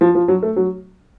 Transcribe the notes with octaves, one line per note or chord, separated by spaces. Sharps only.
F3
F3
F#3
A3
F#3